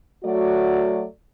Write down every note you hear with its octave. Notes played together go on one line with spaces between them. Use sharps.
F#3 A3 F#4 D5